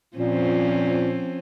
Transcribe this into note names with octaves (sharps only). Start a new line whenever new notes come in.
A#2 F3 C4 C#4